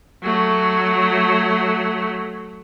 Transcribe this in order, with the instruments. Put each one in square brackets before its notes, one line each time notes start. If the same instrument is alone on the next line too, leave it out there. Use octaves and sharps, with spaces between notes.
[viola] F#3 A3